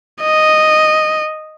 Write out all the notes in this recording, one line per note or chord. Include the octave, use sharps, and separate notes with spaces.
D#5